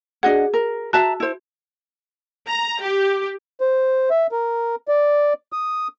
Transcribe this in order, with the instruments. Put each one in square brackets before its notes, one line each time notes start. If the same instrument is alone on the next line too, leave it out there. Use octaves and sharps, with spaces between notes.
[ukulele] D4 D#5 F#5 [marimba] F#4 G#4
[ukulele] A#4
[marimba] F#4 [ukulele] E5 A5 A#5
[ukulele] E4 C5
[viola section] A#5
G4
[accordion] C5
E5
A#4
D5
D#6